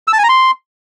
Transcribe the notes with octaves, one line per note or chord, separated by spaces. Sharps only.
E6
A5
G#5
A#5
C6